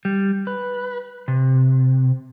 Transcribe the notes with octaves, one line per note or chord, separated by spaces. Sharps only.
G3
B4
C3